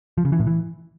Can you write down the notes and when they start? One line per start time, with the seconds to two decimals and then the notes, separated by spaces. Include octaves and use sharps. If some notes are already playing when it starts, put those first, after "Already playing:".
0.18 F3
0.25 C#3
0.32 E3
0.39 A2
0.47 E3